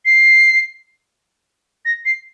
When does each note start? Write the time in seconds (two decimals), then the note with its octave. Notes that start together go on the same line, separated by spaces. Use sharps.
0.05 C7
1.85 A#6
2.05 C7